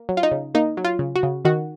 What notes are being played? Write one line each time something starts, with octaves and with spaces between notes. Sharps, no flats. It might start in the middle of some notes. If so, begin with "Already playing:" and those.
Already playing: A#3
F#3
F4
D#4
C#3
A#3 D#4
F#3
F4
C#3
F#4
C#3
D#3 F#4